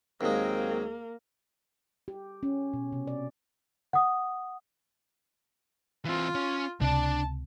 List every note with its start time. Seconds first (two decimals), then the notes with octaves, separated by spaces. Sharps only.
0.21 D#2 F#3 G#3 A#3 C4 G#4
2.08 G4
2.43 C#4
2.74 B2
2.93 C3
3.07 D5
3.93 F#5 D#6
6.05 E3 C4 F4
6.35 C#4
6.81 C#2 C3 D4 D5 A5